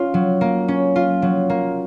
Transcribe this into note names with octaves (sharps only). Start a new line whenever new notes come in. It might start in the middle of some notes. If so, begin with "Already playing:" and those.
Already playing: C#4 F4
F#3
A#3
C#4
F4
F#3
A#3